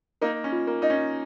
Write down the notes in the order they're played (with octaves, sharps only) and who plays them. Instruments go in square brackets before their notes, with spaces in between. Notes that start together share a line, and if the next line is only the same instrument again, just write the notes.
[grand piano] A#3 D#4 [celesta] A#4
[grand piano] C#4
[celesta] F4
[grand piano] A#3
[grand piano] D#4 [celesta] D#5
[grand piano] C#4